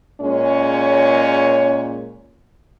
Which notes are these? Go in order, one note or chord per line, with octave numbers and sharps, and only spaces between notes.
A#2 G#3 C#4 C#5